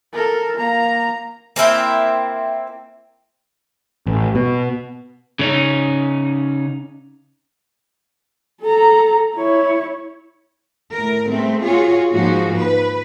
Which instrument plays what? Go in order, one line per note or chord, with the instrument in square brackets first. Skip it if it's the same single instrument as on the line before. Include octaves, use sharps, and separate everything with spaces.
[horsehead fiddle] A4 A#4
A#3 A#5
[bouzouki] A#3 C4 E4 G5
[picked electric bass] A1
B2
[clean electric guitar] C#3 C#4 D#4
[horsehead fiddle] A4 A#5
E4 C#5
[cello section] A2 A#4
G#3 A3 B3 C4
F4 F#4 G#4 C#5
G#2 F3 G#3 A#3 D#4 F#4
B4